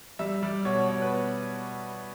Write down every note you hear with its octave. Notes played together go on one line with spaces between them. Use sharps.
G3 E5
G3 D5
B2 C#5
B2 C#5
B4